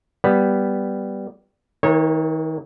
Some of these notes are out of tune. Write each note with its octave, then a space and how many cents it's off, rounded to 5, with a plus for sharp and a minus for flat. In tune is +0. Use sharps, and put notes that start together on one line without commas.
G3 +0 B3 +0
D#3 +40 A#3 -10 C#5 -25